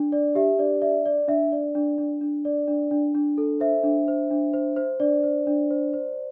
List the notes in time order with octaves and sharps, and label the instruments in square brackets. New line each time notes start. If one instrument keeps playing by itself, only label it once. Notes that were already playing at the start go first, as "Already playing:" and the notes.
Already playing: [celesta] D4
D5
G4 E5
D4 D5
D5 E5
D5
D4 E5
D5
D4
D4
D4
D5
D4
D4
D4
A4
C5 E5
D4
C5
D4
C5
C5
D4 D5
C5
D4
C5
C5